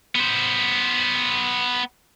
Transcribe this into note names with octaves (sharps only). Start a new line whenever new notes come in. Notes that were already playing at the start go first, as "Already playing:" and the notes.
B3 C5